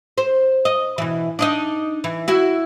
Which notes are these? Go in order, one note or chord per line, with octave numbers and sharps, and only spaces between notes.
C5
D#5
B2 E3
D4 D#4 D#5
E3
E4 F#4